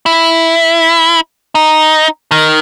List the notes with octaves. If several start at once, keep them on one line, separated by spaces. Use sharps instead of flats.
E4
D#4
D#3